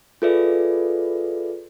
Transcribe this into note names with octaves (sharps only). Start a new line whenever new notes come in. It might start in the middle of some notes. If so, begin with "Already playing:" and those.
F4 G#4 A4 B4 D5 E5